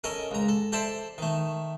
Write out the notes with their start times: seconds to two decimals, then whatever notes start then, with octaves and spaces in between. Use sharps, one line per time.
0.04 C#4 A4 A#4 D#5
0.31 C#2 A#5
0.49 A4
0.72 A4 C5 D5 E5 A5
1.18 D#3 A3